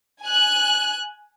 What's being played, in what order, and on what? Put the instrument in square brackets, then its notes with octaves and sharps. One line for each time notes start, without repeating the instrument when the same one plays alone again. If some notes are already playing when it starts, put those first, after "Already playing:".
[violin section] G#5 F#6